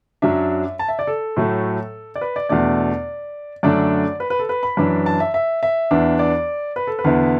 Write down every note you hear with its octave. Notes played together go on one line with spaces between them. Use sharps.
F#2 F#3 D4 E5
A5
E5
D5
A4
A2 F#3 A3
D5
B4
D5
E2 B2 A3 D4 D5
F#2 D3 A3 D4 D5
B4
B4
A4
B4
B5
F#2 E3 D4
A5
E5
E5
E5
E2 E3 D4
D5
B4
A4
B4
E2 D3 B3 E4